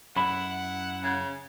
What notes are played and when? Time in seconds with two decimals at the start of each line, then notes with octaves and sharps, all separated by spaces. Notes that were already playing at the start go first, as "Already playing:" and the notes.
0.16 F#2 E4 F#5 B5
1.03 C#3